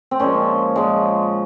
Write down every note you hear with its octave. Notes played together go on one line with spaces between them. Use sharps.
C4
A#2 F3 G#3 C#4
A#2 F3 G#3